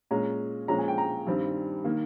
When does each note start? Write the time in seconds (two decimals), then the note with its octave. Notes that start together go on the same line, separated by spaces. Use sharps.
0.11 A#2 G#3 C#4 A#5
0.68 A#2 F3 G#3 C#4 A#5
0.78 G#5
0.88 G5
0.98 A#5
1.27 G2 D#3 G3 C4
1.84 D#3 A#3